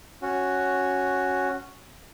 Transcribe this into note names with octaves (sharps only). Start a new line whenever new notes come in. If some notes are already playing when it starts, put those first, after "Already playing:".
C#4 F#4